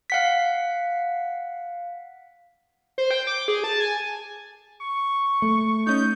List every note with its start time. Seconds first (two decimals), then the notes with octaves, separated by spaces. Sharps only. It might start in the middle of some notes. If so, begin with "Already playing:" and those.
0.10 F5 F#5 B6
2.98 C5
3.11 G5
3.27 D6
3.48 G#4
3.64 A5
3.80 G#5
4.81 C#6
5.42 A3
5.87 C#4 D#4 G6